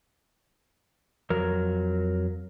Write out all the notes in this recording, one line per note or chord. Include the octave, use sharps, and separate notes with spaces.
F2 F#3 A#4